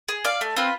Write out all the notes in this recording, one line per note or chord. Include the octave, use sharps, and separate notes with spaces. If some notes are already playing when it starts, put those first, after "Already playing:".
G#4
D5 F5
A3
C4 F4 B4